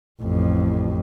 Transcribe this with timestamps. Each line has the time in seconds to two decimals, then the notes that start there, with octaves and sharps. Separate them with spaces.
0.22 A1 F2